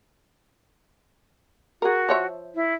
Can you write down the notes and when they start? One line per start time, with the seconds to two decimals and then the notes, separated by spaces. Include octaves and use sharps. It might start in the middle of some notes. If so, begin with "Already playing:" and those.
1.82 F#4 G#4 A#4
2.09 F3 C#5 E5
2.55 E4